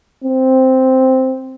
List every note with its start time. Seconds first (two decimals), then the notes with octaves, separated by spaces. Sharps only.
0.24 C4